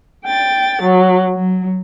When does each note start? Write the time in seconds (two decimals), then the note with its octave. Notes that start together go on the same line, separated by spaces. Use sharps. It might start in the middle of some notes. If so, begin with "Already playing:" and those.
0.25 G5 A6
0.81 F#3
1.35 F#3